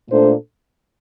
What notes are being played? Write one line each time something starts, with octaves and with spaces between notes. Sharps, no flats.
A#2 A3 D4 A4 C5